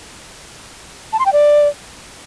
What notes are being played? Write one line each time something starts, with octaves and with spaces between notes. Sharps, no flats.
A5
C6
G5
D5